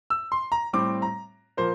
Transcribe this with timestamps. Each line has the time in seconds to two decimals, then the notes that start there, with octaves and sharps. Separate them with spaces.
0.10 E6
0.32 C6
0.52 A#5
0.73 A2 G3 C4 D6
1.02 A#5
1.57 A#2 F3 A#3 C5